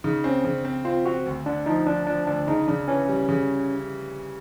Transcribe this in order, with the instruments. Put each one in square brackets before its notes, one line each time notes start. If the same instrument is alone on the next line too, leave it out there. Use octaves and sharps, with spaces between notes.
[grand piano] C#3 [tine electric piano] D#4
[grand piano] C4 [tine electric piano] C#4
[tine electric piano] C#4
[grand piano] C#3 [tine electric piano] D4
[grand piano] C4
[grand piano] C4 [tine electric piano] F4
[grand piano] C4 [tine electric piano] F#4
[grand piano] D2
[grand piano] D3 [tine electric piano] D4
[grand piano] F3 [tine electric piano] D#4
[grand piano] F3 [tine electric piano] D4
[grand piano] F3 [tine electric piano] D4
[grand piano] D2 [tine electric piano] D4
[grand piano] C#3 [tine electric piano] D#4
[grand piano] C#3 [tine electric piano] D4
[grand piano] E3 [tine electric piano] C#4
[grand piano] G3
C#3